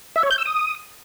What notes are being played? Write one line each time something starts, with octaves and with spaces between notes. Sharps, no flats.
E5
C#5
G6
E6
D#6